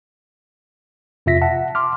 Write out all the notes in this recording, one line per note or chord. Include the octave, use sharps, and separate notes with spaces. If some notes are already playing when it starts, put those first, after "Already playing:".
F2 C3 F4 E5 A#6 B6
E5 F#5 A5
C6 D6 F6